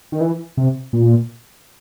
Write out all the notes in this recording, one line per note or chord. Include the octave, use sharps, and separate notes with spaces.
D#3
E3
C3
A#2